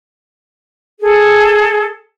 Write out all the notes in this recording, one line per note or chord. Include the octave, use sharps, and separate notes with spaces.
G#4 A4